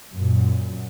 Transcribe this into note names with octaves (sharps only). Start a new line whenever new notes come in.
F#2 A#2